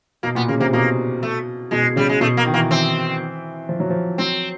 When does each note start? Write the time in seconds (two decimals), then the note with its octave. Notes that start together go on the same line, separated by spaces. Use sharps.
0.23 B2 A#3
0.35 A#2 B3
0.48 C#3 A#3
0.60 C3 A#3
0.73 B2 A#3
1.23 A3
1.71 B2 G#3
1.96 C#3 G3
2.09 G#3
2.21 B2 A3
2.37 A#3
2.46 D#3
2.53 E3 A#3
2.71 E3 C4
3.69 F3
3.80 F#3
3.90 F3
4.18 F#3 C4